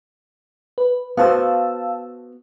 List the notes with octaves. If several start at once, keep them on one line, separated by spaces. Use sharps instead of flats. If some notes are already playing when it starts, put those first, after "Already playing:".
B4
B3 F#4 C5 F5 A5 E6